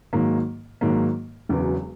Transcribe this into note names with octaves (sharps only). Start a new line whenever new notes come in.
G#2 D#3 F#3 A#3
G#2 D#3 F#3 A#3
E1 E2 C#3 F#3 B3